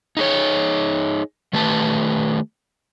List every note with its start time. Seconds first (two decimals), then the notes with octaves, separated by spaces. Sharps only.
0.17 D#4 G#4 C#5
1.53 D#3 A3 G4 B4 A5